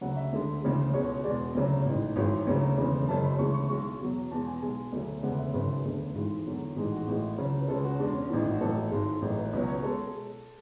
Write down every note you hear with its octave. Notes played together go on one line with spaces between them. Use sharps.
D2 C#3 F#3 F#5
E5
D2 D3 G#3
D2 C#3 E3 G#3
C#2 B2 G#3 C#5
E1 E2 B2 G#3 D5
D2 C#3 F#3
A1 G#2 E3
G#1 F#2 E3 G#3 C#5
D2 C#3 F#3 C#5
E1 D2 C#3 E3 G#3
F#1 F#2 C#3 G#3 A5
B5
D2 C#3 E3 G#3 C#6
C#6
B1 B2 G#3 C#6
E2 B2 F#3
E2 B2 G#3 A5
G#5
B1 B2 G#3 G#5
D2 D3 F#3
E1 D2 C#3 G#3 F#5
E5
G#1 F#2 C#3 G#3 B4
E1 D2 D3
G#1 G#2 E3 G#3
E2 D3 F#3
A1 G#2 E3 G#3 G#4
F#4
A1 A2 G#3
C#2 C#3 F#3
B4
C#2 C#3 G#3 A4
G#4
F#4
E2 B2 G#3 D4
C#4
A1 G#2 E3 D4
E4
F#4
A1 A2 F#3 A4
G#1 G#2 G#3
A1 A2 F#3
B4
C#2 B2 F#3 B4
C#5
B2 G#3 A4